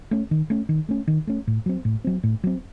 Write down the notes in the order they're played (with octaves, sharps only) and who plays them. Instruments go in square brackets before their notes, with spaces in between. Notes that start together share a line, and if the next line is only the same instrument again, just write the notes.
[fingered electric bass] A3 C#4
D#3
A3 C#4
D#3
A3 C#4
D#3
A3 C#4
A2
F#3 C4
A2
F#3 C4
A2
F#3 C4